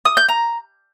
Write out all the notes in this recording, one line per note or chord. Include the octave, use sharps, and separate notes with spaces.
D#6
G6
A#5